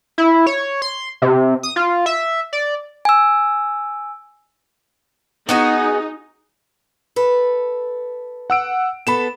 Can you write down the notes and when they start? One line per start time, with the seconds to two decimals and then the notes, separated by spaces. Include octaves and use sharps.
0.18 E4
0.47 C#5
0.82 C6
1.22 C3
1.63 D#6
1.76 F4
2.06 E5
2.53 D5
3.05 G#5 E6
5.49 B3 D#4 F#4 G#4
7.16 A4 B4
8.50 F#5 E6 D7
9.07 B3 A4 B5 E7